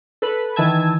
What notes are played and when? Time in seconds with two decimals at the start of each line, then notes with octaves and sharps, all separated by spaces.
0.22 A4 B4 B5
0.56 D#3 E3 G#5 A5 E6 G#6